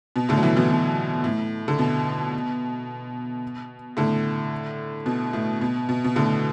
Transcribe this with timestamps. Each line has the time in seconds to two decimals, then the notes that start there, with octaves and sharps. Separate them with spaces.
0.16 B2
0.29 A2 D3
0.37 F#3
0.43 B2 E3
0.56 B2 E3
0.70 B2
1.24 A2
1.68 D3
1.79 B2
3.97 A2 D3
5.06 B2
5.33 A2
5.61 B2
5.89 B2
6.04 B2
6.16 A2 D3